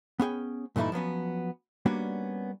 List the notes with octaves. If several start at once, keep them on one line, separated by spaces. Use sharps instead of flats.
B3 C#4 G#4 G5
G2 A#2 E3 A3 D#4 E4
F3 F#3 B3 C#4
G3 A#3 B3 C#4 D4 F#4